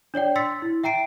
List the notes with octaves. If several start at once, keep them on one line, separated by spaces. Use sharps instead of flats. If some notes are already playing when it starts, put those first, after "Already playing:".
D4 C#5 D5 G5
C6 E6 A6 B6 C#7
E4
E5 G5 A#5 C7 D7